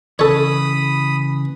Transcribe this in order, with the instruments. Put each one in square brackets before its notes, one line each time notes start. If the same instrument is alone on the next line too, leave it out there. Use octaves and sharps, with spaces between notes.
[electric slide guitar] C#3 E3 [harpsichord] A4 C#5 [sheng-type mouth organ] B5 D#6